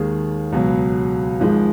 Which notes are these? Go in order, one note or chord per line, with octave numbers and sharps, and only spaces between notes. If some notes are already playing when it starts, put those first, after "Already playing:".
Already playing: D#2 D#3 G#3 G#4
C#2 B2 F#3
G#1 G#2 F3 G#3